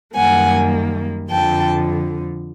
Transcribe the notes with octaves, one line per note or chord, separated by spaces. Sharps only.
F#2 D#3 G3 A#3 F#5 G#5
F2 D3 F3 G5 A5